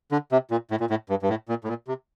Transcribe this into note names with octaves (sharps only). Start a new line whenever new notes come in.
D3
C3
A#2
A2
A#2
A2
G2
G2
A2
A#2
A2
A#2
C3